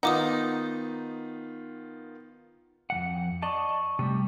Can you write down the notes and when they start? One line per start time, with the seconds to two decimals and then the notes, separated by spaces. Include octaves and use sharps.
0.03 D#3 B3 D#4 F4 F#5 D6 D#6
2.90 F2 E3 F#5
3.42 D5 D#5 A5 C#6
3.99 C3 G3 A3